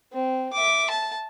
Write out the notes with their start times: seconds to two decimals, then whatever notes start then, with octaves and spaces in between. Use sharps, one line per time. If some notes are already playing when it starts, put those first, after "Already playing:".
0.13 C4
0.53 E5 D6
0.90 A5